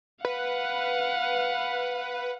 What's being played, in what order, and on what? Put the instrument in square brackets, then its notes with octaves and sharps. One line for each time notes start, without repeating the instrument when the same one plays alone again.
[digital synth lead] B4 [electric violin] F5 F#5